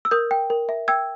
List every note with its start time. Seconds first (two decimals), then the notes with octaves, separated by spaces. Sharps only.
0.05 E6
0.11 A#4 D#6 G6
0.31 G5
0.50 A#4
0.69 E5
0.88 G5 E6 G#6